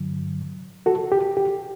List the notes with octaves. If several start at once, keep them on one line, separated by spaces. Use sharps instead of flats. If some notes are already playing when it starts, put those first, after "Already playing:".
Already playing: G2 D3 F#3
F#4 A4
G4
G4